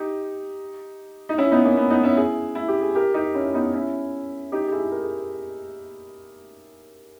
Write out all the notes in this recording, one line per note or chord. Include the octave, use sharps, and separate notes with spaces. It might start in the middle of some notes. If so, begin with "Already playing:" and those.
Already playing: D#4 G4
D#4
C#4 E4
B3 D#4
A#3 C#4
B3
B3 D#4
C#4 E4
E4 G#4
E4
G4
G#4
G4 A#4
D#4 G4
C#4 E4
B3 D#4
C#4 E4
D#4 G4
G4
E4 G#4
A#4
G#4